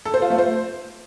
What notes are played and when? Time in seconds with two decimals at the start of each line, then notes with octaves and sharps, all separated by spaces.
0.05 A4
0.14 C5
0.22 F4
0.30 A3
0.38 C5